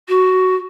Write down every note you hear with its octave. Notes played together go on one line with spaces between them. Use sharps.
F#4